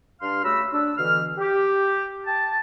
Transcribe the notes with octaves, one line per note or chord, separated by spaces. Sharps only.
G2 D4 F5 C6 F6
C#3 A3 F#4 B5 E6
D4 E6
B2 D3 E3 F6
G4
G5 A5